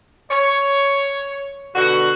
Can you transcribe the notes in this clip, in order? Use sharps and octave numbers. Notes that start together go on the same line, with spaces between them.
C#5
B2 D3 F#4